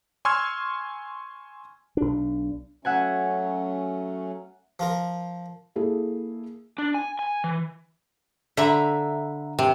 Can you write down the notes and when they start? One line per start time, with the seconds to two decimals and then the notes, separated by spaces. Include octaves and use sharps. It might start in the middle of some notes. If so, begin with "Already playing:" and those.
0.25 G#5 C6 C#6 E6 F6 G#6
1.97 B1 D4
2.85 F#3 A3 C#4 E5 F#5 G#5
4.79 F3 F4 A#4
5.76 A#3 E4 G#4 A4
6.78 D4
6.94 G#5
7.19 G#5
7.44 E3
8.57 D3 E5 A#5 B5
9.59 C3